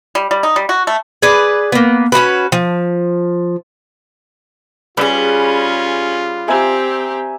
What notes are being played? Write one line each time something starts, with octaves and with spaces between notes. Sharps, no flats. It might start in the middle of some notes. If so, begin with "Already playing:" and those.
G3
G3
D#4
G3
F#4
A3
G#4 B4 D5
A#3 B3
C#4 D#4 F#4 B4
F3
G3 C#4 F4 G#4 B4 D5
C4 G4 E5 G#5 A#5